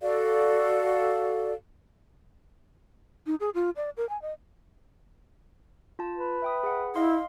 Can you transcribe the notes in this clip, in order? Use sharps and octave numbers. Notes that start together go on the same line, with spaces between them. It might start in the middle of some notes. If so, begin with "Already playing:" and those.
F#4 A4 D5 F5
D#4
G#4
F4
D5
A#4
G#5
D#5
F4 A5
B4
E5 G5 D#6
G#4 F#5
E4 D#5 F5 C6